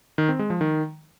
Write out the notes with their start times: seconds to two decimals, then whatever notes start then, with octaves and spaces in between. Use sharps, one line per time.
0.18 D#3
0.29 C4
0.39 G#3
0.50 F3
0.61 D#3